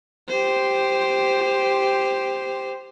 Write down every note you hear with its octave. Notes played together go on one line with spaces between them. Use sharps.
G4 C5